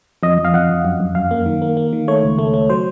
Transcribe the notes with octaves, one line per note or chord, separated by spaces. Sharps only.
F2 D#5
F2
F5
F2 F#5
F2
F#2
F#2
F#2 F5
A#3
D#3
A#3
A#3
D#3
A3 C#5
C#2
A3
A3
F#3 C5